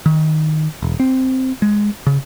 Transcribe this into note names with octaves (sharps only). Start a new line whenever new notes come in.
D#3
E1
C4
G#3
C#3